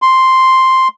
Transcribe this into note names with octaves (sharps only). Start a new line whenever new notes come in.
C6